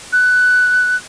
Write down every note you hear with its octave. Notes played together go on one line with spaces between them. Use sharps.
F#6